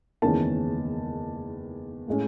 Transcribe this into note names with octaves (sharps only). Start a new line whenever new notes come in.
F#1 E2 D#3 G#3 C#4 A5
A2 G#3 C#4